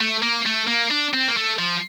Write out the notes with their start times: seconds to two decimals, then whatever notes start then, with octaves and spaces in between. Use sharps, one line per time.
0.01 A3
0.23 A#3
0.46 A3
0.68 A#3
0.91 D4
1.13 C4
1.28 A#3
1.37 A3
1.59 F3